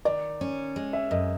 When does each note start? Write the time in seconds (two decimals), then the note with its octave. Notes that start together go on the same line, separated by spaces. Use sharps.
0.05 D#3 D5
0.41 C#4
0.76 G#3
0.93 E5
1.11 F#2 D#5